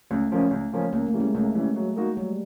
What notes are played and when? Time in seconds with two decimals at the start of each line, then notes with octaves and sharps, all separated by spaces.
0.11 C#2 A3
0.31 C#3 F3 A#3 C#4
0.51 C#2
0.72 C#3 F3 A#3 C#4
0.93 C#2 A#3
1.07 A3
1.14 C#3 E3 G3
1.20 G#3
1.35 C#2 A3
1.55 C#3 E3 G3
1.76 F#3
1.96 A#3 D#4 F#4
2.17 F#3 G3